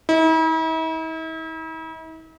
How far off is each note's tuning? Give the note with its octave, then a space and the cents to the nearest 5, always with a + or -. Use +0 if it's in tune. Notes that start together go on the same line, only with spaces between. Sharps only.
E4 -45